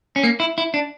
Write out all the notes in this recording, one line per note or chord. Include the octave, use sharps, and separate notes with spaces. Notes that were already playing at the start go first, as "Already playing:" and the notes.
C#4
A#3
E4
E4
D4